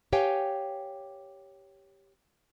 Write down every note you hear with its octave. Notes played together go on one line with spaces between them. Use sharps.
G4 B4 C#5 F5 G5 G#5